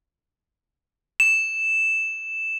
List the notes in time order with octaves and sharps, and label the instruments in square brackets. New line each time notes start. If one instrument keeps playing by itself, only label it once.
[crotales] E7